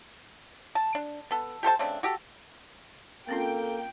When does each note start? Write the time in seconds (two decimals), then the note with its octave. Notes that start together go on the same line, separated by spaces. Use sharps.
0.75 A5
0.95 D4
1.31 B3 A4
1.63 G4 A4 C5 A5
1.79 C#3 A3 C4 D4
2.03 F#4 G4 A4
3.29 A#3 C4 C#4 F4 A4 G5